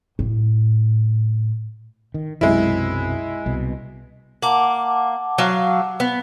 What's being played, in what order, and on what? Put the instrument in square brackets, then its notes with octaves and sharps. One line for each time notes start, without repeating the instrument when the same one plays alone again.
[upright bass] A2
[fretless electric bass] D#3
[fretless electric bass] B1 F#2 C3 [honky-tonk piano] G#3 E4
[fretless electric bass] C2 B2
[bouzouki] A#3 [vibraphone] F#5 A5 D6
[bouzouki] F#3 F5
B3